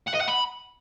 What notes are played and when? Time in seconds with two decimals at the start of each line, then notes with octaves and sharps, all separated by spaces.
0.07 F#5
0.14 D#5
0.21 F#5
0.28 B5